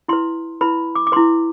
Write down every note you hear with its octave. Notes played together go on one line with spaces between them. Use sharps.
E4 B4 C6
E4 B4 B5
D6
D6
E4 B4 C6